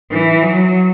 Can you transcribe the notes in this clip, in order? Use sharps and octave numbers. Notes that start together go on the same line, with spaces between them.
E3
F#3